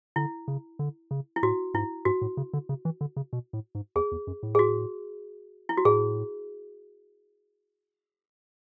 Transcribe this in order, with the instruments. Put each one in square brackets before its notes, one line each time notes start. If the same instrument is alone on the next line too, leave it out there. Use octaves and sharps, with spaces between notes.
[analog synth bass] D3 [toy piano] E4
[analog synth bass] C#3
D3
C#3
[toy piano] E4
[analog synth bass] A2 [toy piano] F#4
[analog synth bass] G#2 [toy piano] E4
[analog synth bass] G#2 [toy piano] F#4
[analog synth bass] A2
C#3
D3
C#3
E3
D3
C#3
B2
A2
G#2
[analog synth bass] E2 [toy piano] G#4
[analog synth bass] E2
F#2
A2
[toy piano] G#4
F#4
E4
F#4
[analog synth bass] A2 [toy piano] G#4